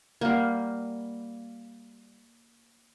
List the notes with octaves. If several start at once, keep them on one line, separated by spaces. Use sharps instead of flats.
G3 A#3 A#4 F5 F#5